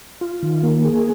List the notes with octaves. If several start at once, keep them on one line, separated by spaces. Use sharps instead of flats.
F4
D#3
A#3
G#4